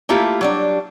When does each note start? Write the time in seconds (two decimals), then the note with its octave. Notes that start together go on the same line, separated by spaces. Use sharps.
0.09 A3 A#3 E4 F4 G4
0.41 F#3 G3 D4